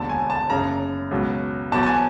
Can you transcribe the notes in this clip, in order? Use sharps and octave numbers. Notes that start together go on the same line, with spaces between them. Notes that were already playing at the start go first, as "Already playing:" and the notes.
Already playing: E1 D#2 D3 A5
G#5
A5
F#1 F#2 C#3 A#5
C#2 B2 F#3
E2 B2 F#3 A5
A5
G#5